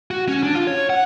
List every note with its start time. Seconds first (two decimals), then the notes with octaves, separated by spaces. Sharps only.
0.11 F#4
0.28 C#4
0.43 D4
0.55 F4
0.67 C#5
0.90 F#5